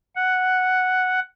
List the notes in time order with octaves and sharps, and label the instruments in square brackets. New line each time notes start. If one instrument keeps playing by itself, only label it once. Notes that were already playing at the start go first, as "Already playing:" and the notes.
[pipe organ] F#5